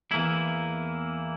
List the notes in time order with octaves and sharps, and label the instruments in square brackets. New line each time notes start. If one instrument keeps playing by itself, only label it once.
[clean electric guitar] E2 E3 A#3 E4